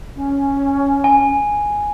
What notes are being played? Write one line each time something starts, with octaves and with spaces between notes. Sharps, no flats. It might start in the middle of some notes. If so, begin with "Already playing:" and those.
C#4
G#5